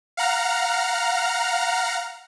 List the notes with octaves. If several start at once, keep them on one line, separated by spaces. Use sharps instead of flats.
F5 F#5 A#5 F6